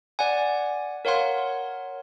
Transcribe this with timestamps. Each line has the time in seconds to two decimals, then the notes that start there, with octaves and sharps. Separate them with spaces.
0.19 D5 F#5 G#5
1.05 A#4 C#5 F5 F#5 C6